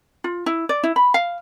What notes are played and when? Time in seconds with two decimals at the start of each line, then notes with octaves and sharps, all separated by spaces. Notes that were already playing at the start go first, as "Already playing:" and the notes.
0.24 F4
0.46 E4
0.69 D5
0.83 E4
0.96 B5
1.14 F5